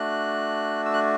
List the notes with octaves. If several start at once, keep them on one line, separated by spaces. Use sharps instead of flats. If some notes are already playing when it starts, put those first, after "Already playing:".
Already playing: A3 D4 F#4 F#6
E6
F#6